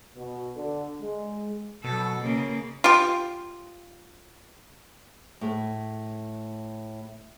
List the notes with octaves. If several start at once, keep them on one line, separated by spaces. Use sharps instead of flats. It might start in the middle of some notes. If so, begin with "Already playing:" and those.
B2
D3
G#3
B2 F#3 A4
C#3 A#3
F4 G4
A2 A3